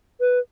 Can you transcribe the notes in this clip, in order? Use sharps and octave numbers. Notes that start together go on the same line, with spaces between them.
B4